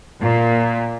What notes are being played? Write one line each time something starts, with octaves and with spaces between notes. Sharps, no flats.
A#2